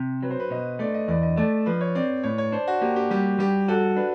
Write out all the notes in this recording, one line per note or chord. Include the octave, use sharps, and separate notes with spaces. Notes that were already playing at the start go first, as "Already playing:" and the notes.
Already playing: C3
F#3 B4
C5
B4
B2 D#5
A3 D5
D#5
E2 D5
D#5
A3 D5
F3 B4
C#5
C4 D5
A2 C#5
C#5
D4 C5
F#4
A#3 G4
G4
G3 G4
G3 G4
F#4 A4
D4 B4